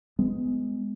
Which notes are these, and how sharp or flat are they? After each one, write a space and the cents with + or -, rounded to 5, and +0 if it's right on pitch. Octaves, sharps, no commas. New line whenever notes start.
G#3 +0 B3 +25